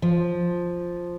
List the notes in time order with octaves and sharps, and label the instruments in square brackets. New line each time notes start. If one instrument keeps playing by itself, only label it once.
[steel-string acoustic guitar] F3